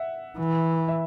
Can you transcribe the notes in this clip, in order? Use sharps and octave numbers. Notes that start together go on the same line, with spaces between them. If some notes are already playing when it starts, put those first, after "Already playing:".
Already playing: E5 F#5
E3
E5